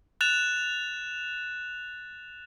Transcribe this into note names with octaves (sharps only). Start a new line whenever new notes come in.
F#6 A6 E7 F7